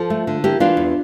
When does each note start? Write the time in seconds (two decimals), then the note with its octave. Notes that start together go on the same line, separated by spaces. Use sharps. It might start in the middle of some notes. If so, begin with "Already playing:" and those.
Already playing: F3 F4 A4
0.10 A3
0.27 D3
0.44 A#3 E4 G4
0.60 E3 D4 F4
0.77 E2